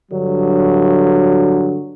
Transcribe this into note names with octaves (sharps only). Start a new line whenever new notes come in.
G2 D3 F#3